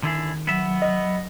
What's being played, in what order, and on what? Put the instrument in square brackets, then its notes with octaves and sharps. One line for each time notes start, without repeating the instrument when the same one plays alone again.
[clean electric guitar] D3 E4 G#4 [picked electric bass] D#3
[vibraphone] F#3 [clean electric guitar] B3 E5
[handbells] D#5